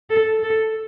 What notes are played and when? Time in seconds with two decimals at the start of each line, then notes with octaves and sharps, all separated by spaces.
0.10 A4
0.43 A4